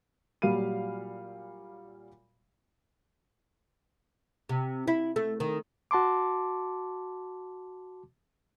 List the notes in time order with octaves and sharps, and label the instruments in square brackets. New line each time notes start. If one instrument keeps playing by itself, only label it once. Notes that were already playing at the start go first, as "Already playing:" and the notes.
[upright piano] A#2 F#3 G3 F5 B5 D#7
[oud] C3
E4
A3
D#3
[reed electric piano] F#4 A5 C6 D6